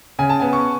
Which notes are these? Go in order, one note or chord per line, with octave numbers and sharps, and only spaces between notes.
C#3 G#5
A5
B3 G#5
C#6